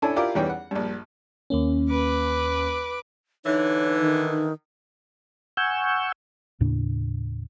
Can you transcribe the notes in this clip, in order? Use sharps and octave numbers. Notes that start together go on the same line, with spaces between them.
C#4 D4 E4 A4 G#5
E4 F4 G4 A#4 D5 F5
E2 G3 B3 C#4 D#4 G5
F#5
A#1 G2
D#2 A#3 C#4
B4 D6
D3 E3 D#4 C#5
D#3
F#5 G#5 C#6 E6 G6
D#2 A2 C#3 D4